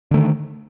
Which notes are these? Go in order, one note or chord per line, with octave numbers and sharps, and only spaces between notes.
D3 D#3 A3